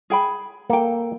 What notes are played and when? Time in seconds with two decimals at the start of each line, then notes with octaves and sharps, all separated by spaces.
0.10 G#4 G5 B5
0.70 A#3 A4 G5